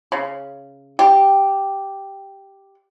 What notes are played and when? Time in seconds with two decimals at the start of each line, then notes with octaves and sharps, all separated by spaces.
0.12 C#3
0.99 G4